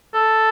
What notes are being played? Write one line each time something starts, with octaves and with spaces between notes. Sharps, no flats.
A4